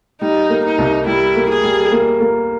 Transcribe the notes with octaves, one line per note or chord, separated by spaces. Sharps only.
G3 D#4
A#3
D#4
C2
G3 E4
A#3
G#4
G3
A#3
A#3